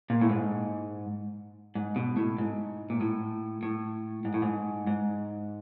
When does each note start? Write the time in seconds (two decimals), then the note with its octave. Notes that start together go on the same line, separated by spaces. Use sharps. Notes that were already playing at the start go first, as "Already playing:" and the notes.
0.10 A#2
0.21 A2
0.30 G#2
1.75 G#2
1.96 B2
2.17 A2
2.38 G#2
2.90 A#2
3.01 A2
3.63 A2
4.25 G#2
4.34 A2
4.42 G#2
4.87 G#2